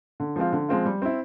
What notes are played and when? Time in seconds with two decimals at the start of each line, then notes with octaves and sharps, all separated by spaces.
0.20 D3
0.36 F3 G#3 C4 F4
0.52 D3
0.69 F3 G#3 C4 F4
0.85 G3
1.02 C4 E4